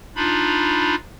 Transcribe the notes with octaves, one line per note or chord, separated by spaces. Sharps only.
D4 D#4 F4 B5